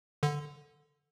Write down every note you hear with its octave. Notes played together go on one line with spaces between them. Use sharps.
D3